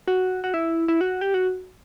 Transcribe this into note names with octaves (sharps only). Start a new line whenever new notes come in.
F#4
F#4
E4
E4
F#4
G4
F#4